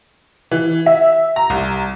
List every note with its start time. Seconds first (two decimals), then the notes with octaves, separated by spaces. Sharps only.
0.51 E3
0.86 E5
1.36 A#5
1.50 C2